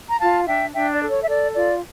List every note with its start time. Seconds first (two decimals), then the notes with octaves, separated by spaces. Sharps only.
0.09 A#5
0.20 F4 F5 A5
0.47 D4 E5 G5
0.74 D4 E5 G5
0.93 D5
1.01 A4
1.11 C#5
1.23 E5
1.28 A4 D5
1.56 F4 D5